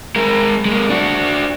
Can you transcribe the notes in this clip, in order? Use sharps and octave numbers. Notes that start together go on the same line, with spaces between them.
G#3 A#4
G#3 A#3
D4 F#4